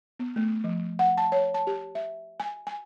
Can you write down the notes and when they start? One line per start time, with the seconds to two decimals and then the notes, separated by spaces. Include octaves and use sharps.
0.19 B3
0.36 A3
0.64 F3
0.99 F#5
1.18 A5
1.32 C#5
1.54 A5
1.67 G4
1.95 E5
2.40 G#5
2.67 G#5